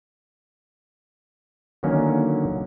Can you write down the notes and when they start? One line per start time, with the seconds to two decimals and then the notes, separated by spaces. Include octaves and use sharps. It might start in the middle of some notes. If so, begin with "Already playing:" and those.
1.83 D3 D#3 F#3 A#3 C#4